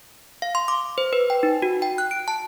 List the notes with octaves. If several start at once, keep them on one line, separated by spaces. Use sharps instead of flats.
F5
C6
D6
C5
B4
G5
D#4
F#4
G5
F#6
D7
A5